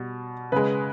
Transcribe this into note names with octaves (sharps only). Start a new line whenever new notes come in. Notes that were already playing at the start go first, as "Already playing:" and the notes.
Already playing: B2 G3
C#3 G#3 B4